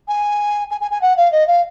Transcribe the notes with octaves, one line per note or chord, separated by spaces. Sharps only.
G#5
G#5
G#5
G#5
F#5
F5
D#5
F5